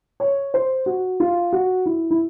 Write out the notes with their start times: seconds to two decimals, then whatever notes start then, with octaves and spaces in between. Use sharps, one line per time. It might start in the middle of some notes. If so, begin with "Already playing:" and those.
0.20 C#5
0.54 C5
0.86 F#4
1.20 F4
1.53 F#4
1.86 E4
2.10 E4